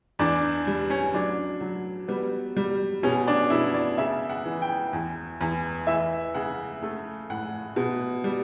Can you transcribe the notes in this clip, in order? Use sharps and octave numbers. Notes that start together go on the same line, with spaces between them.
E2 D4
G3
C#4
F#3 D4
F#3
G3 B3
G3
B2 C#4
D4
B2 E4
D5
C#3 E5
F#5
E3
G5
E2
E2
E3 E5
C#3 F#5
A3
A2 F#5
B2
G3